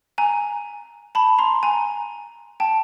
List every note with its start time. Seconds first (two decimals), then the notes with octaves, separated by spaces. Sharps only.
0.18 G#5 A#5
1.15 A5 B5
1.39 A#5 C6
1.63 G#5 A#5
2.60 G5 A5